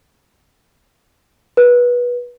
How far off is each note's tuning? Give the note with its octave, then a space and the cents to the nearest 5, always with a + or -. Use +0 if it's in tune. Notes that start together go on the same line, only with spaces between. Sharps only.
B4 -20